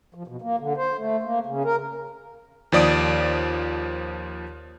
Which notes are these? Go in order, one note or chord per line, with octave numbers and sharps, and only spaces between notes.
F3
B2
A#3
D3
C5
A3
A#3
C#3
A#4
D#2 F3 D5 D#6 D7